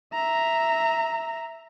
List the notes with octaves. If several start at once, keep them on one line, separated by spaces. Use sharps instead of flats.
E5 A#5